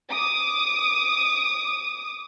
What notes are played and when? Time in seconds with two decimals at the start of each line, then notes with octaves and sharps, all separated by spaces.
0.12 D6 D#6